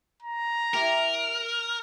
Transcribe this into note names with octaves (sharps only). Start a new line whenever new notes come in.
A#5
E4 G4 A#4